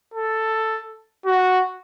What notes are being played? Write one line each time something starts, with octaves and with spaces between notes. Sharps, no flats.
A4
F#4